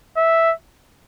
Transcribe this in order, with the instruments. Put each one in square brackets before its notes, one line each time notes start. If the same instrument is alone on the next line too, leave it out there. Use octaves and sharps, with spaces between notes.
[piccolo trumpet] E5